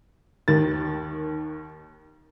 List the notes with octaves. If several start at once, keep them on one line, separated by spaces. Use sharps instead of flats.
D#2 D#3 A6